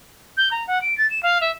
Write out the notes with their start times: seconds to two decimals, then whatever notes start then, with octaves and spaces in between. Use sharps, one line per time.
0.37 G6
0.51 A#5
0.67 F#5
0.81 D7
0.97 A6
1.10 E7
1.23 F5
1.41 E5